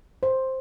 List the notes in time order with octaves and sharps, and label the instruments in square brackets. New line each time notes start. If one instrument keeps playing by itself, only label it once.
[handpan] C5